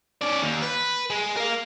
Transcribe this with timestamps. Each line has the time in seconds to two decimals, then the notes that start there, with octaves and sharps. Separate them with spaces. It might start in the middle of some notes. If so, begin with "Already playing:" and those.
0.22 C#4 D5
0.43 D#2
0.62 B4
1.10 G#3
1.37 A#4 F5